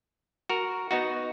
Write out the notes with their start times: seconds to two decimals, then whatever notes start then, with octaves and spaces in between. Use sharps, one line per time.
0.49 F#4 A#4
0.91 B3 D#4 F#4